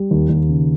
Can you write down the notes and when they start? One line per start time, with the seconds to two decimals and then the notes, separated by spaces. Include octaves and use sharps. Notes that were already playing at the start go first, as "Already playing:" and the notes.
Already playing: G3
0.11 D#2
0.29 D#2
0.49 C#3